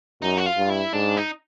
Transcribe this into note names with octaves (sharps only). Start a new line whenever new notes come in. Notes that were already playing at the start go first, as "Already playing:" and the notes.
F#2 D#4
F#4
F4
G2
E4
G#2 D4
D#4